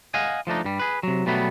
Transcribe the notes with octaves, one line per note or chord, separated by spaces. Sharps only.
D#5 F5 F#5 G#5
F3 A3 D4 D#4
G2 G3
G#4 B4
C3 F#3
B2 F#3 G3 A3 B3